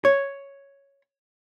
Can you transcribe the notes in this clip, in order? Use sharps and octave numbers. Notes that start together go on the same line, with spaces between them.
C#5